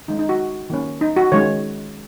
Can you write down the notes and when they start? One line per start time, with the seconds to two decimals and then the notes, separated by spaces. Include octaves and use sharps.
0.08 D#3 G#3 C#4 D#4
0.19 D#4
0.29 F#4
0.70 D#3 A#3 C#4
1.01 D#4
1.16 F#4
1.32 D#3 G#3 C#4 C#5